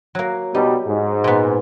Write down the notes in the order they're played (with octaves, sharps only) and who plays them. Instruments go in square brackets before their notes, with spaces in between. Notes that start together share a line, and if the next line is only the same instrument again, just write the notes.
[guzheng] F#3 A#3
[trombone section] B2 G3 [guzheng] D#4
[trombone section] G#2
[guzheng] A#2 B3